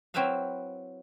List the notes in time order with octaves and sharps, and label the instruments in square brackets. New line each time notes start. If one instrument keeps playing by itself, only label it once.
[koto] F#3 C4 E4 B4 E5 F5